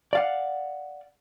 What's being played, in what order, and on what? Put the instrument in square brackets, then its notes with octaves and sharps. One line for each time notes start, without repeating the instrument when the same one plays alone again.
[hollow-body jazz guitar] D5 F5 F#5